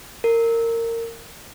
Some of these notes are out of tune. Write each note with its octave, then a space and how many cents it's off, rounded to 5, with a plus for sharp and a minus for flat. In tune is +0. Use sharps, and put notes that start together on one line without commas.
A#4 -20